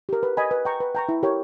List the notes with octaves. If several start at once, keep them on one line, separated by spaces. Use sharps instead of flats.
G4 A#4
B4
D#5 G#5 B5
B4
G5 A#5 C#6
B4
G5 A#5 C#6
E4
G4 A#4 C#5 G5